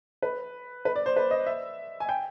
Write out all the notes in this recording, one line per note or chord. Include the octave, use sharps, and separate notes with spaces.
B4
B4
D5
C5
B4
D#5
E5
G#5
G5